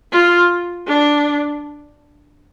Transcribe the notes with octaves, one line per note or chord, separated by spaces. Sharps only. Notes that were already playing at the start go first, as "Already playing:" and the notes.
F4
D4